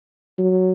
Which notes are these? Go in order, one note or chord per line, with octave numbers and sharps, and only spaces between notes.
F#3